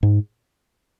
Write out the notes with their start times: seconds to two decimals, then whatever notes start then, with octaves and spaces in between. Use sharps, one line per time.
0.03 G#2